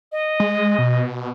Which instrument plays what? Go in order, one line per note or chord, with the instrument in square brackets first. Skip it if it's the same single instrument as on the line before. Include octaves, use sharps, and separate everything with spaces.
[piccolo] D#5
[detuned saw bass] G#3
B2